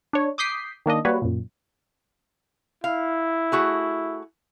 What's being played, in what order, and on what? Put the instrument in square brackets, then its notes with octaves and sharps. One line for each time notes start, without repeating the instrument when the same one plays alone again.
[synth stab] D4 C#5
D6 D#6 G6 B6 C7
D#3 A#3 D4 D#5
G3 A#3 F#4 B4 C#5
F#2 A#2
[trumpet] E4 [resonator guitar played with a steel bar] F5
[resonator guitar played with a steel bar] A3 F#4 G#4